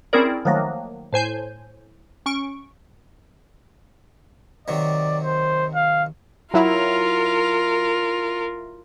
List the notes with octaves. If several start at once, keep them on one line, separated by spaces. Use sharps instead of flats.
C4 C#4 E4 G#4 A#4 D5
D#3 F3 F#3 A3 A#3
A2 C5 G#5 G6
C#4 C#6 D7
C3 D#3 F#3 D5
C5
F5
F#3 E4 F4 A#4